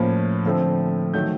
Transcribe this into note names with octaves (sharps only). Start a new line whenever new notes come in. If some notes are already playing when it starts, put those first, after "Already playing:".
Already playing: A2 F3 A#3 C#4
D3 F3 A3 C4
D#3 F#3 A3 G6